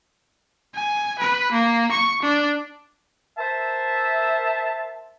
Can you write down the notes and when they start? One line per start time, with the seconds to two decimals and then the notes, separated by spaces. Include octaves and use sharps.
0.75 G#5
1.19 B4
1.52 A#3
1.91 C#6
2.22 D4
3.38 A#4 C5 E5 A5